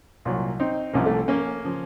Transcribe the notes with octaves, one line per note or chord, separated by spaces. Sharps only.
C2 A#2 F#3
C4 D#4
C2 C3 F3 A#3 C#4
A3
A#3 C#4
C#3 F3